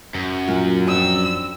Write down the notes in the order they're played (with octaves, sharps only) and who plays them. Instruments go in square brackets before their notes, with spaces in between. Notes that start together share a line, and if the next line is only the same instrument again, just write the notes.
[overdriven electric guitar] F#2
[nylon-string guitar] A#2 F#3 F4
[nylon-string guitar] F2 D4 G5 [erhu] E6